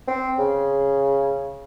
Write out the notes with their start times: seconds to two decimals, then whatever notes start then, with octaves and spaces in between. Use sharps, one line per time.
0.08 C4
0.39 C#3